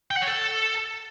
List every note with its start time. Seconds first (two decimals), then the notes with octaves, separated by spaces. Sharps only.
0.11 G5
0.16 F#5
0.22 C#5
0.27 A4